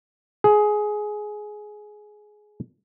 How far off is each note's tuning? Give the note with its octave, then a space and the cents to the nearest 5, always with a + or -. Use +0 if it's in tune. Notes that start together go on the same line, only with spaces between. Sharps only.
G#4 +15